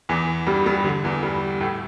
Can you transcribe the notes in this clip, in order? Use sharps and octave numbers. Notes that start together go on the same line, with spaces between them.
E2 E3
G2 G3
G2 G3
D3
E2 E3
G2 G3
A2 A3